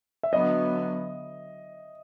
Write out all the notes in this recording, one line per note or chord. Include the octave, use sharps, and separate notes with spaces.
E5
D3 F#3 B3 D#5